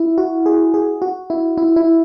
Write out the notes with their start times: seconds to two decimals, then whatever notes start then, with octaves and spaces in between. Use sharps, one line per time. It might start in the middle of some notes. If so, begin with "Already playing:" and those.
Already playing: E4
0.18 F#4
0.46 G#4
0.74 G#4
1.02 F#4
1.30 E4
1.58 E4
1.76 E4